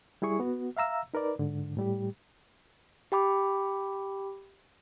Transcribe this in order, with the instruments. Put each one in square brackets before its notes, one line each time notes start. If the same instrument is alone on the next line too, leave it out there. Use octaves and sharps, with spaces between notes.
[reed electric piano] G3 E4 G#4 C#6
B3 F#4
E5 F5 A#5 E6
D#4 A#4 B4 D5
G#2 D3
A2 G3 G4
[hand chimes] G4 G5 B5 D6